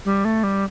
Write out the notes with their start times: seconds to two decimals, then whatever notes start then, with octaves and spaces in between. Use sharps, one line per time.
0.05 G3
0.25 A3
0.43 G3